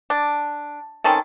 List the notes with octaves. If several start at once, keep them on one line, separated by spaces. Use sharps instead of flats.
D4
D#3 C4 C#4 A4